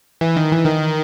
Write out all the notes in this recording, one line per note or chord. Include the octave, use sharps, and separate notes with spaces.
E3
D#3
E3
D#3